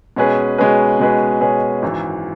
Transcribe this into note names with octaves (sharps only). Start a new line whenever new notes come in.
B2 G#3 C#4 G#4 B4
B2 G#3 C#4 G#4 B4
B2 G#3 C#4 G#4 B4
B2 G#3 C#4 G#4 B4
G#1 F#2 E3